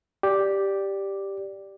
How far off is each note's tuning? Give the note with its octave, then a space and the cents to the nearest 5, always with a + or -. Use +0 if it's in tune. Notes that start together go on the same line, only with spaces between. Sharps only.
G4 +0 D5 +0